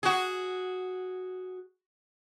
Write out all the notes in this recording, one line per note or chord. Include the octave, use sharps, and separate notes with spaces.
F#4 G#4